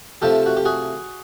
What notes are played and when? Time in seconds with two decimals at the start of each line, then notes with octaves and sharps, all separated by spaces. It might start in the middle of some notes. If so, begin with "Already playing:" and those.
0.22 C3 F3 A3 G4 A4
0.46 F#4
0.57 G4
0.65 F#4 G#4